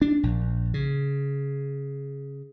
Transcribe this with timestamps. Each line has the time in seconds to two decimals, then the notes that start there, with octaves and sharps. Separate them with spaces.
0.02 D4
0.23 A#1
0.74 C#3